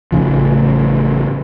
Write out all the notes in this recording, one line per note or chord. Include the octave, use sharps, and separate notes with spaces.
A1 A2 C#3 F3